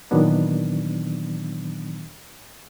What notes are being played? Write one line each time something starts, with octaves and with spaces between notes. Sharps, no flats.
A#2 D#3 E3 F#3 B3 D4